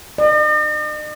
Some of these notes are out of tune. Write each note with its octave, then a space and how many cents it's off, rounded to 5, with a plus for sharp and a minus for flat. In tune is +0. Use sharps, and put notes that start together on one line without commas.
D#5 -45